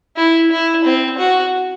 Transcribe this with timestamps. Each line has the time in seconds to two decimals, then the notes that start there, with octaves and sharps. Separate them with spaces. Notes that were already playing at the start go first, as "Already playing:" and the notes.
0.17 E4
0.51 E4
0.85 C4
1.18 F#4